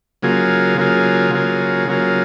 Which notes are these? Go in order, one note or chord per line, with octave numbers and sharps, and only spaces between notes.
C#3 F#3 A#3 F4 G#4
C#3 F#3 A#3 F4 G#4
C#3 F#3 A#3 F4 G#4
C#3 F#3 A#3 F4 G#4